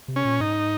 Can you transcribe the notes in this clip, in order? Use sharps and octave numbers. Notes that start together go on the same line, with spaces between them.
C3
C#4
A#2
G#2 D#4